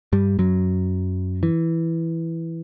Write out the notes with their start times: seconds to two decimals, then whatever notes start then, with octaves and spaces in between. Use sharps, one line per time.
0.13 G2 G3
0.39 F#2 F#3
1.43 E3